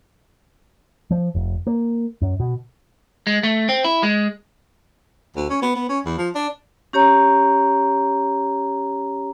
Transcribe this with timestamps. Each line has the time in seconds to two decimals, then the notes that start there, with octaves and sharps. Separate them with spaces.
1.11 F3
1.35 F1
1.67 A#3
2.22 F#2
2.40 B2
3.27 G#3
3.43 A3
3.69 C4
3.84 E4
4.03 G#3
5.37 D2
5.50 C#4
5.62 B3
5.76 B3
5.89 C#4
6.06 E2
6.18 F3
6.35 D4
6.93 C#4 G4 C#5 A#5